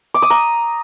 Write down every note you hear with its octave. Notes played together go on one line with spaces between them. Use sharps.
D6
D#6
A#5